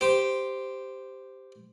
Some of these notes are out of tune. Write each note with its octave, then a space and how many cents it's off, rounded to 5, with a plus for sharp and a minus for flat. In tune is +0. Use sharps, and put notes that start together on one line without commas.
G4 +0 C5 -10